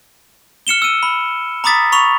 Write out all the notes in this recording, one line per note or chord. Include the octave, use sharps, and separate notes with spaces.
F6 C#7 E7 G7
E6 D#7
B5
A#5 B5 D6 D#6 A6 B6
B5 C#6 F7